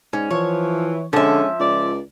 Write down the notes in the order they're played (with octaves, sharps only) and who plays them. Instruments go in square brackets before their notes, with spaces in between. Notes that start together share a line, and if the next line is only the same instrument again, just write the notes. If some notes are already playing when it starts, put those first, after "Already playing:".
[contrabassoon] G#2 [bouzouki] C#4
[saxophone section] E3 [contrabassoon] F3 [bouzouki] C#5
[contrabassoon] D3 [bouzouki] F3 E5 [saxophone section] G#3 C#4
[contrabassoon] C#2 [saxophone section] D5